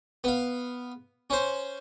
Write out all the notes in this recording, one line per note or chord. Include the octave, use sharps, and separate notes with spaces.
B3 F5
C#4 C5